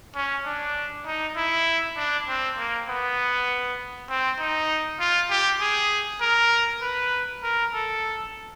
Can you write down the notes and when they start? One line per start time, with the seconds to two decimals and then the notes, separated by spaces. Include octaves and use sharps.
0.15 C#4
0.45 D4
1.06 D#4
1.36 E4
1.97 D4
2.28 C4
2.58 A#3
2.88 B3
4.10 C4
4.40 D#4
5.00 F4
5.30 G4
5.61 G#4
6.21 A#4
6.82 B4
7.43 A#4
7.73 A4